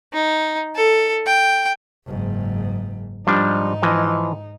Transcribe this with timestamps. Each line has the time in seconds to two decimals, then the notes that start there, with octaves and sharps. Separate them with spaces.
0.13 D#4
0.76 A4
1.26 G5
2.07 F#1 G#2
3.27 G#2 F3 G3 D4 D#4
3.82 E3 F3 D#5